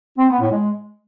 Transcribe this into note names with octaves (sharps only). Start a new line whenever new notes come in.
C4
B3
A2
G#3